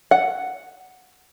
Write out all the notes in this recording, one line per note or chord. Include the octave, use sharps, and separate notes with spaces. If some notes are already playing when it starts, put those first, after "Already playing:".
F#5